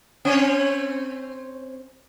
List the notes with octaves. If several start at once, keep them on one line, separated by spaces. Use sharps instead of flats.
C4 C#5